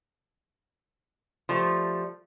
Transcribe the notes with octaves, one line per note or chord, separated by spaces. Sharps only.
F3 G3 A3